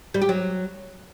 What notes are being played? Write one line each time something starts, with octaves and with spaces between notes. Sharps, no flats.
G3
G4
F#3